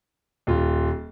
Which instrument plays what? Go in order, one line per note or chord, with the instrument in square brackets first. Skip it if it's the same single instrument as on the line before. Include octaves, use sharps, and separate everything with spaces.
[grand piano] D#1 F4